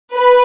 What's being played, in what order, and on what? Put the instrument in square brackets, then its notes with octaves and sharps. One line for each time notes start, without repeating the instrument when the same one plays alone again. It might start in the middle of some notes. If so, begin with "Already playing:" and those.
[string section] B4